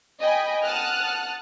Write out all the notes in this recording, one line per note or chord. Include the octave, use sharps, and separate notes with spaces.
D#5 G5 G#5 B5
F#5 A5 D#6 F6 F#6